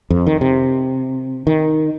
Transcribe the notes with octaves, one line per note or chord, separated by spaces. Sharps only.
F2
D#3
C3
D#3